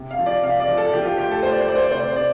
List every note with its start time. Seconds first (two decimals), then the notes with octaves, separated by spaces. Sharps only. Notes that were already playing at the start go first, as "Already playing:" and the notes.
Already playing: C3
0.11 F5
0.19 F3
0.26 D5
0.43 C3 F5
0.60 D5
0.68 F3
0.77 A4
0.93 F3 G4
1.01 F4
1.05 G4
1.18 D2 G4
1.31 A4
1.43 D2 C5
1.51 D5
1.60 C5
1.68 D2 D5
1.75 C5
1.83 D5
1.92 C3 C5
1.99 D5
2.08 C5
2.16 C3 D5